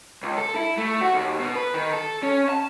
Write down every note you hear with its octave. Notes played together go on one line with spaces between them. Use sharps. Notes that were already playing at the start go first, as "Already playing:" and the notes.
C#2
A4
E4
A3
F#4
D#2
B2
B4
D#3
A4
C#4
A5